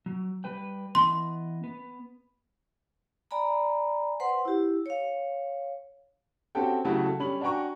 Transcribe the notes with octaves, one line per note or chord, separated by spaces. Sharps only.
F#3
G3 B4 G5
E3 B3 D#5 C6
B3
D5 G#5 A#5 B5
B4 C5 F#5 C6
E4 G4
C#5 F5
C4 C#4 F#4 G4 A4 G5
C#3 F#3 A3 E4 F#4 G4
A4
G3 C#4 B5 F#7
D4 F#4 G5 G#5 A#5 C#6